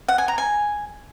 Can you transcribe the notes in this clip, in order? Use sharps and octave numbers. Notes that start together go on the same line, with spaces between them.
F#5
G#5
A#5
G#5